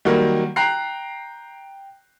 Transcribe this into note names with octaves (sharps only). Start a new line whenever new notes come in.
D#3 F#3 G3 A#3
G5 A#5 F#6 C7